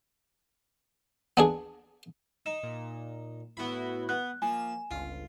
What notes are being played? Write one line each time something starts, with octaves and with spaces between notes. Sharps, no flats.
B3 D4 G#4
D#4 E7
A#2
A2 B3 E4 F#4 B5
B3 F#6
F3 A#3 G#5 E7
G1 C#2 F4